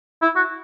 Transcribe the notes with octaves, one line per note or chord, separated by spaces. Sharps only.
E4
F#4